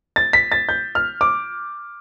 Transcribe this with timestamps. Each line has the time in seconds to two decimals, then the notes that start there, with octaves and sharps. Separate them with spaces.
0.16 A6
0.33 B6
0.52 A6
0.69 G6
0.95 F6
1.21 D6